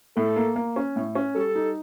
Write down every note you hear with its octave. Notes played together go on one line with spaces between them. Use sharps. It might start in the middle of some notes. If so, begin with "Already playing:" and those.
A2 A4
A#3
A#3
C#4
A2
C#4
G3 A4
D#4